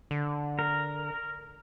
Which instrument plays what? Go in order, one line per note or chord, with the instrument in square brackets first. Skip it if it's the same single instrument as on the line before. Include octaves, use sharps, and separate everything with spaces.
[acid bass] D3
[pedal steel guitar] A#4